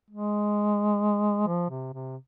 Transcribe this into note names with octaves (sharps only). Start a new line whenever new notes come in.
G#3
F3
C3
C3